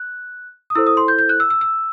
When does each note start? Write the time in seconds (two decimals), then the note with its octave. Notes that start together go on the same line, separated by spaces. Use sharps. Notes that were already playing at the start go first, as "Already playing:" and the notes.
Already playing: F#6
0.70 D#6
0.75 E4 A4 C5 E6
0.87 D#6
0.97 C6
1.08 G6
1.19 G6
1.29 F#6
1.40 E6
1.50 E6
1.61 E6